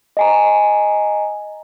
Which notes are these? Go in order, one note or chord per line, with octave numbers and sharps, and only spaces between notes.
D#5 G#5 A#5